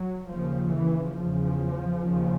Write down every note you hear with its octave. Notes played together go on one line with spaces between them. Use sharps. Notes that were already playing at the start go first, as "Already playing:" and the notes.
Already playing: F#3
D#2 C#3 F3
E3
E2 C#3 F3
D#2 C#3